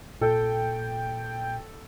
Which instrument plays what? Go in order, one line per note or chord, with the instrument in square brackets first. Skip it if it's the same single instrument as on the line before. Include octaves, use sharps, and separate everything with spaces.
[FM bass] A#2 [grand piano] A4 [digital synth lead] G5